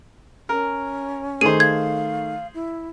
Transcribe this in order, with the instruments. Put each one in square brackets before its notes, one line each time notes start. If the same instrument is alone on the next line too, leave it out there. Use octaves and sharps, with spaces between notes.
[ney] C#4 [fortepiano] A#4
[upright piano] D#3 A3 [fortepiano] G#4 C5 [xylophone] D#7
[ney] F5 [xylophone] G#6
[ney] E4